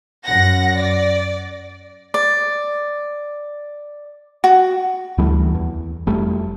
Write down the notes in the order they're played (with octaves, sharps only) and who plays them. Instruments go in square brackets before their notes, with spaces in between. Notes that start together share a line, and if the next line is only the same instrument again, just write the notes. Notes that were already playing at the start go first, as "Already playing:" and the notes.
[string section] F#2 F#5 A#6
D5
[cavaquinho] D5
F#4
[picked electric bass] D2 E3 G3 A3
E2
F1 G3 A3